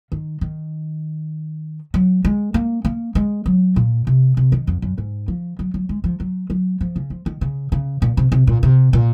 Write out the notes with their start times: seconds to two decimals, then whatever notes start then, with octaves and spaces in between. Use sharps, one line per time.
0.12 D#3
0.41 D#3
1.94 F#3
2.25 G#3
2.54 A#3
2.85 A#3
3.15 G#3
3.46 F#3
3.76 A#2
4.07 C3
4.37 C3
4.52 D#3
4.67 F2
4.82 F#2
4.98 G#2
5.28 F3
5.59 F#3
5.74 F#3
5.89 G#3
6.04 F3
6.20 F#3
6.50 F#3
6.81 F3
6.96 C#3
7.10 F3
7.26 D#3
7.41 C#3
7.72 C#3
8.02 A#2
8.17 C3
8.32 C3
8.47 A#2
8.63 C3
8.93 A#2